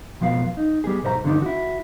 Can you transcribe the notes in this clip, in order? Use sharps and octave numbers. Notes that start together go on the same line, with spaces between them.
F2 B2 F3 B3 F5
D#4
G3 B3 G#4
B1 G#2 C5 D#5 A#5
G2 D3 D#3 G3 D4 D#4
E4 F#4